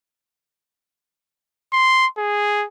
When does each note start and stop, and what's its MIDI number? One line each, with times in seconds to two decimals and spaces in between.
1.73 2.07 84
2.18 2.66 68